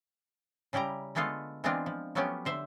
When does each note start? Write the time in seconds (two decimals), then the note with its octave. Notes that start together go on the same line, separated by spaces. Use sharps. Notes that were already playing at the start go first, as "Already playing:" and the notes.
0.73 C#3 G3 E4 G4 A#5
1.15 D3 G#3 A3 B3 F4 A4
1.64 E3 G#3 B3 C4 D4 F4
1.86 F3
2.15 F3 F#3 A3 B3 C#4 G4
2.45 D3 C5 E5